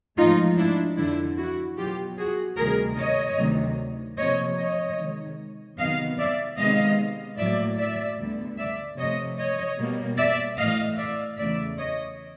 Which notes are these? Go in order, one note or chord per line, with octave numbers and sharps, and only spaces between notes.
G#2 F3 A3 D#4 F4
D4 E4
F2 D3 F3 D4 E4
E4 F#4
B2 F#3 B3 F4 G4
F#4 G#4
D2 C3 D#3 G3 G#4 A#4
C#5 D#5
D2 C3 D#3 F#3
C3 F3 A#3 C#5 D#5
C#5 D#5
C3 D#3 G#3
C3 D#3 F#3 B3 D#5 F5
D5 E5
C3 D#3 G#3 B3 D#5 F5
A2 F#3 A#3 D5 E5
D5 E5
D2 D3 G3 B3
D5 E5
C3 F3 A3 C#5 D#5
C#5 D#5
B2 G3 A#3
D5 E5
A2 E3 A3 D#5 F5
D5 E5
E2 C#3 E3 A3 D5 E5
C#5 D#5